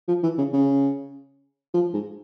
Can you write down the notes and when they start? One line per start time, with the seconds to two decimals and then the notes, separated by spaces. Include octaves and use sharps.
0.08 F3
0.23 E3
0.38 C#3
0.53 C#3
1.74 F3
1.94 G#2